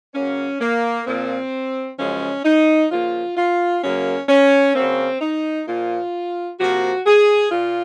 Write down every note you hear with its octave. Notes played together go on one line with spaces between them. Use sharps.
C#3 F#3 A#3 C#4
A#3
A#2 F3 A#3 C4
F#2 C#3 F3 G#3 C#4
D#4
C#3 F3 A#3 F4
F4
F#2 C#3 F#3 A#3 C#4
C#4
C#3 F#3 A#3 C4
D#4
A#2 F3 A#3 F4
C3 F3 A#3 F#4
G#4
A#2 F4